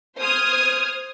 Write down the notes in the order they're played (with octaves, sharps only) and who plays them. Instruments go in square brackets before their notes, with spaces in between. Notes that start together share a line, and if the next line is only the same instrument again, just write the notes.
[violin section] C5 D#6 F6 G#6